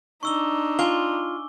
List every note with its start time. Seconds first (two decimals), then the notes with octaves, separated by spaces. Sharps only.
0.23 D4 D#4 C#6 E6 G7
0.79 F4 G#5 D6 G7